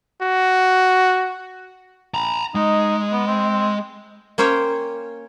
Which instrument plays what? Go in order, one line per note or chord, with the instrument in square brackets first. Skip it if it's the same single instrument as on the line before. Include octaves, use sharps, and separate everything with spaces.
[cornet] F#4
[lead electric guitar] A#5 B5
[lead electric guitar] G#3 [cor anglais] D#4
[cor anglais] B3
C4
[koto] A#3 C#4 C5 C#5 G5